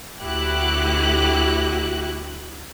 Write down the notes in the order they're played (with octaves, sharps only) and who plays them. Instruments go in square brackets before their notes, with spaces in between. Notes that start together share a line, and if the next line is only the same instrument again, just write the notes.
[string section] D2 E4 F#4 G4 F#6